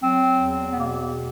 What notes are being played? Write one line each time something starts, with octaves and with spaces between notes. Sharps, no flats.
F#3 C4
E2
B2 B3
A#3